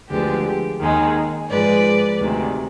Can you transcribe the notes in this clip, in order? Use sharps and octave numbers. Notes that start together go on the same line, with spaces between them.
D2 D3 F3 G#3 B3 G4
D#2 D#3 G#3
G#2 F3 G#3 B4 D5
D2 C3 D#3 G#3